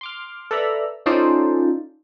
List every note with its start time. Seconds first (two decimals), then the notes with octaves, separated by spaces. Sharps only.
0.01 C6 D6 F6
0.51 A4 B4 D5 E5 A#5 B5
1.06 C#4 D#4 F4 A4 C5 D5